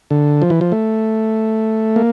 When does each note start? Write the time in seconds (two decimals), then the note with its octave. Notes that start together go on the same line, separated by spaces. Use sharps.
0.11 D3
0.42 F3
0.50 E3
0.61 F3
0.72 A3
1.96 A#3